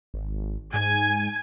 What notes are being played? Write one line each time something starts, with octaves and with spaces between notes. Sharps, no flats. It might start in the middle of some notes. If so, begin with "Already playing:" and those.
G#1
G#2 G#5